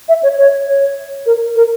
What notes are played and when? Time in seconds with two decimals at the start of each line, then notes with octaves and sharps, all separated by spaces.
0.09 E5
0.23 C#5
0.38 C#5
0.67 C#5
1.26 A#4
1.56 A#4